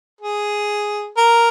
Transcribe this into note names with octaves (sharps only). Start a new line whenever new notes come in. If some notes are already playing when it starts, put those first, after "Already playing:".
G#4
A#4